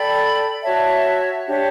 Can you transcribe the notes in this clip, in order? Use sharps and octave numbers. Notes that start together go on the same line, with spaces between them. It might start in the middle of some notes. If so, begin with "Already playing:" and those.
Already playing: A4 D5 G5 B5
F#4 C#5 E5 A5
D4 G4 C#5